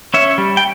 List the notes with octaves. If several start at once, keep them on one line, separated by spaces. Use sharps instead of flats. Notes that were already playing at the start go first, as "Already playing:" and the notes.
C#4 C#5 E5
G3
G5